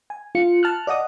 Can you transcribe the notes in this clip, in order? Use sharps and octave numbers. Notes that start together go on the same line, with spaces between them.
G#5
F4 C#7
A5 F6 F#6
D5 D#5 F#5 D#6